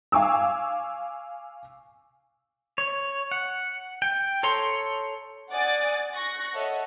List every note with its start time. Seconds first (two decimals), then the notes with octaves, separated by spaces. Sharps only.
0.12 F5 G#5 C#6 D6 E6
2.78 C#5
3.31 F#5
4.02 G5
4.43 A4 C#5 A#5 C6
5.51 D5 F#5 G#5 D6 D#6 A6
6.15 C#6 F#6 A#6
6.54 A4 C#5 D#5 E5 F#5